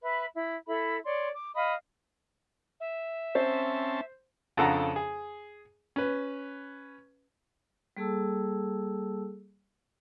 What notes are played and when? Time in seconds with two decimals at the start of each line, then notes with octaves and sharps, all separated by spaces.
0.03 B4 E5 B5
0.33 E4
0.67 E4 A4 E5 B5
1.04 C#5 D5 C6
1.33 D6
1.55 D#5 F5 B5 D#6
2.80 E5
3.35 C4 C#4 C5 A5
4.57 F2 C#3 D4 A4 F#5 A#5
4.96 G#4
5.96 C#4 B4
7.97 G3 A#3 G#4 A4 A5 E6